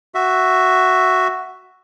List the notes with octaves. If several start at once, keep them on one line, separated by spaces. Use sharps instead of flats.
F#4 E5